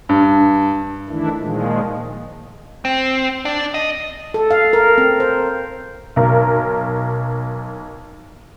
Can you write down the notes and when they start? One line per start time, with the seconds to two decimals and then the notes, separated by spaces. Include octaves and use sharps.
0.09 G2
1.09 D#3 E3 A3 D4 E4
1.38 A#2 D#3 F3 G#3
2.85 C4
3.45 D4
3.74 D#5
4.34 A4
4.51 F5
4.73 A#4
4.98 C4
5.20 C5
6.16 B1 A#4